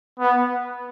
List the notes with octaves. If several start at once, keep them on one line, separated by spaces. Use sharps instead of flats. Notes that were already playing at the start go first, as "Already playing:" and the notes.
B3